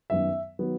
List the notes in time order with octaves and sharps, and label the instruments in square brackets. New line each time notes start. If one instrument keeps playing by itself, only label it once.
[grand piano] F#2 D#3 F#3 B3 E5
D#3 F#3 B3